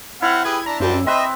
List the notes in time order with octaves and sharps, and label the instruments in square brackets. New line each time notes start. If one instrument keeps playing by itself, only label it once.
[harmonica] C4 F#5 F6 [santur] E4
[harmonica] G4 G#4 B4 [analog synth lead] G#6
[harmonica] D4 [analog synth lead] A#5
[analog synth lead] F#2 [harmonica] G3 C4 D4
[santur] C4 B4 [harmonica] C5 E5 [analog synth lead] D#5